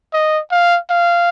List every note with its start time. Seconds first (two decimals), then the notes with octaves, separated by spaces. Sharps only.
0.13 D#5
0.52 F5
0.90 F5